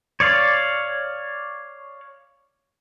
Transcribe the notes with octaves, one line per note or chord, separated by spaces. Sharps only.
C#5 D5 F5